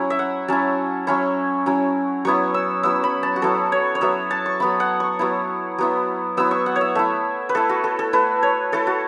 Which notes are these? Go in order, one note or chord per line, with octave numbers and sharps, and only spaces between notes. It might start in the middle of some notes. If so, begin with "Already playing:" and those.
Already playing: F#3 C#4 E4
E5
F#5
F#3 C#4 E4 A5
F#3 C#4 E4 C#6
F#3 C#4 E4
F#3 B3 E4 C#6
E6
F#3 B3 E4 E6
B5
A5
F#4
F#3 B3 E4 A4
C#5
C#5
F#3 B3 E4 E5
A5
C#6
F#3 B3 E4 B5
F#5
C#6
F#3 B3 E4
F#3 B3 E4
F#3 B3 E4 E6
C#6
F#5
C#5
E5
A3 E4 E5
B4
A3 E4 A4
F#4
A4
A4
A3 E4 B4
C#5
A3 E4 A4
F#4